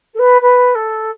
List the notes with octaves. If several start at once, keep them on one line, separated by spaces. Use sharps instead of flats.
A4
B4
B4
A4